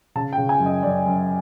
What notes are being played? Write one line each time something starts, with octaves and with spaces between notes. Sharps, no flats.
C#3 A5
G5
C#3
G#5
F#2
D#5
F#2 D5
F#2